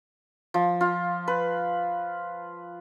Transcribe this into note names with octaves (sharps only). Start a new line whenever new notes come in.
F3
F4
B4